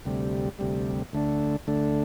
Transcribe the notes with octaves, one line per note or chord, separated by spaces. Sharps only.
D2 C3 G3
D2 C3 G3
D2 D3 A3 D4
D2 D3 A3 D4